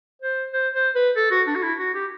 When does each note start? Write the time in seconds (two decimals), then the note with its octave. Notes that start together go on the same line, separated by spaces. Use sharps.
0.22 C5
0.53 C5
0.74 C5
0.95 B4
1.16 A4
1.31 F#4
1.47 D4
1.55 F#4
1.63 E4
1.79 F#4
1.94 G4